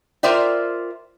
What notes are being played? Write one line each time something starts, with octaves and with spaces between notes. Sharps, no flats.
F4 A#4 C5 D5 E5 G5